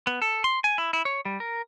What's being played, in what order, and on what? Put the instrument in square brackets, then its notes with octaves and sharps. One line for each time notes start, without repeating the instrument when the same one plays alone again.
[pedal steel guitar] B3
A4
C6
G#5
E4
E4
C#5
G3
A#4